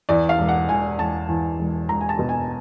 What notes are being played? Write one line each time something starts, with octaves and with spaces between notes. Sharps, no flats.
E2 D5
F5
E1
F#5
E1 G#5
E1 A5
E2
E1
E1 A#5
G#5
A5
B2
G#5